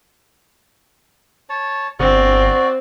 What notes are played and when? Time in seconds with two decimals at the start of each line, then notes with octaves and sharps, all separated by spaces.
1.49 C#5 A5
2.00 G1 C4 F#4 D5